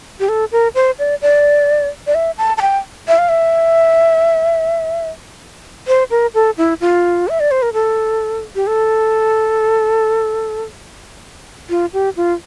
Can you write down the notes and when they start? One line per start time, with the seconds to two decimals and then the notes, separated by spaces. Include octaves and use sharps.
0.20 G4
0.29 A4
0.52 A#4
0.75 C5
0.99 D5
1.22 D5
2.07 D5
2.15 E5
2.38 A5
2.57 A5
2.62 G5
3.08 E5
3.18 F5
3.29 E5
5.87 C5
6.10 A#4
6.34 A4
6.58 E4
6.81 F4
7.28 E5
7.40 D5
7.51 C5
7.62 A#4
7.73 A4
8.56 G4
8.67 A4
11.70 F4
11.93 G4
12.16 F4